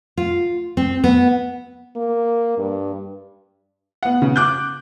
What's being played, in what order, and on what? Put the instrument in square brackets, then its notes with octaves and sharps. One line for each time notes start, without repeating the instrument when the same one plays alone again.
[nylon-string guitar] F4
C4
B3
[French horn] A#3
G2
[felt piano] B3 F#5
C#3
D6 F#6 G6